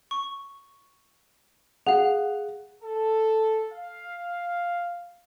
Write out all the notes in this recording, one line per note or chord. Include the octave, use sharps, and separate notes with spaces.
C#6
G#4 F5 F#5
A4
F5